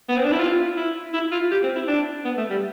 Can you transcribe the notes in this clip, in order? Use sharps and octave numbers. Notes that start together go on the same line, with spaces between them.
B3
C4
D4
E4
F4
E4
E4
F4
G4
C4
E4
D4
B3
A3
G3